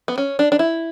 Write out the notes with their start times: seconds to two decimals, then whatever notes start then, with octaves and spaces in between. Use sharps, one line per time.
0.08 B3
0.18 C#4
0.39 D4
0.52 D4
0.59 E4